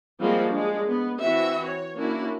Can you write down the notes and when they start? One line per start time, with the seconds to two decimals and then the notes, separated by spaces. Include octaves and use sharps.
0.20 F3 G3 G#3 A#3 C4 F#4
0.50 G#3 D4
0.88 B3
1.20 E3 C4 F#4 E5
1.63 C#5
1.96 A#3 C#4 D4 E4 F#4